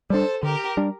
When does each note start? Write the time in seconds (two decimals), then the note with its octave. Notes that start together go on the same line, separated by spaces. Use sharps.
0.10 G3 D4 A4 C5
0.43 D3 G4 A#4
0.77 G3 D4